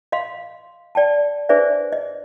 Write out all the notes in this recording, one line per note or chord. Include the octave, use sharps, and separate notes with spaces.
D#5 F5 C6
D5 G5 A5
D4 G#4 B4 C5 D5 E5
D#5